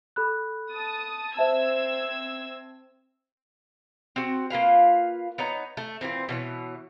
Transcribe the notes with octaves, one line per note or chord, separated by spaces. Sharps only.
A4 B5 F#6
A5 D#6
C4 C5 E5 A5 E6 G#6
C4 F#4
A#3 F4 B4 F5
B3 D#4 C#5 A#5
A3
A#2 C#3 E3 C4
B2 E3 C#5